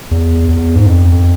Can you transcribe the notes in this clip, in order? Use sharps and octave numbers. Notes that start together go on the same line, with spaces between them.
E2
E2
G#2
F2